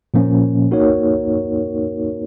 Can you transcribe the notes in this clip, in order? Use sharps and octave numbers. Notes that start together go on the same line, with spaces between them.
A#2 F3 A#3 C#4
A#3 D#4 F#4 A#4 C#5